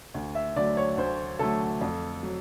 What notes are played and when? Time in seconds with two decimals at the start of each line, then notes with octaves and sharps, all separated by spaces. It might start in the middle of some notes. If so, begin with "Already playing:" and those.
0.14 D2
0.35 E5
0.56 D3 F#3 A3 D5
0.77 C#5
0.98 D2 C5
1.39 D3 F#3 A3 A4
1.81 F2
2.23 F#3